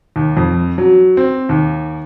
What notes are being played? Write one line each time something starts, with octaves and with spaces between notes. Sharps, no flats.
D#2
F2
F#3
C4
D#2